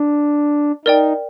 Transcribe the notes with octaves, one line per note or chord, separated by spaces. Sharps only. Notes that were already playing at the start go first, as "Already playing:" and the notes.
Already playing: D4
D#4 A#4 D5 G5